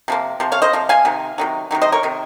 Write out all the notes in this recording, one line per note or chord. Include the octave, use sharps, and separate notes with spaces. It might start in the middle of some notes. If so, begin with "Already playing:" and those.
C3 F3 A#3
C3 F3
C#5 F5
C5 D#5
C3 F3
F5 G#5
C3 D#3
C3 D#3 F#3
C3 D#3 F#3
C5 D#5
A#4 C#5
C3 D#3